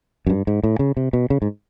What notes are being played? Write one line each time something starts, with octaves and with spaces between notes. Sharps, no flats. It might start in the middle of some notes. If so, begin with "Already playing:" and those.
F#2
G2
G#2
A2
C#3
C3
B2
C#3
G#2